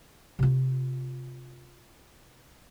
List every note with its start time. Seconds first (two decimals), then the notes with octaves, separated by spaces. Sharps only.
0.39 C3 F4